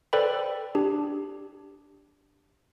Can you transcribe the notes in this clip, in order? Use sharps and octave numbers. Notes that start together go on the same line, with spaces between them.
A4 B4 C5 D5 G5 B5
D4 G4